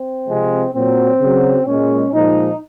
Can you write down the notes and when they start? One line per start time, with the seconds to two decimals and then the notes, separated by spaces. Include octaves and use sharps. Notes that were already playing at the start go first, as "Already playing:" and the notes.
Already playing: C4
0.28 C3 F3 G#3
0.74 A#2 F#3 C4
1.20 C#3 F#3
1.67 A#2 G#3 C#4
2.13 A#2 F3 G#3 D#4